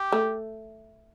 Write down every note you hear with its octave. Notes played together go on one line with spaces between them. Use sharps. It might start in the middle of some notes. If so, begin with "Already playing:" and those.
Already playing: G4
A3